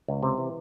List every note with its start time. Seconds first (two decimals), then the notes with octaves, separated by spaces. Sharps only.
0.08 C#2
0.23 C3
0.38 E3